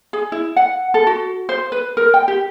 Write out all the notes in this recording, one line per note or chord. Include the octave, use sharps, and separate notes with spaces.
G#4
E4
F#5
A4
F#4
C5
B4
A#4
G5
G4